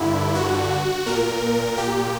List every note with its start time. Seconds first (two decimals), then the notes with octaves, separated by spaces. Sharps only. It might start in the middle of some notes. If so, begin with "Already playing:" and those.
Already playing: G2 D3 E4
0.35 F#4
1.06 A#2 A#4
1.78 G4